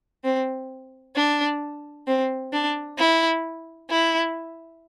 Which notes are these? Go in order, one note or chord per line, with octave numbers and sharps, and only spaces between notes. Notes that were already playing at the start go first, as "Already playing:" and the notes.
C4
D4
C4
D4
E4
E4